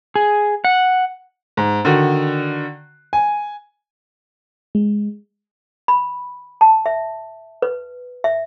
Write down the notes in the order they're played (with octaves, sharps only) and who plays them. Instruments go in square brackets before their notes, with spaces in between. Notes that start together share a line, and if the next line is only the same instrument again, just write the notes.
[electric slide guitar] G#4
F#5
[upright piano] G#2
D3 D#3 F#4
G#5
[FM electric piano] G#3
[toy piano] B5
A5
E5
B4
E5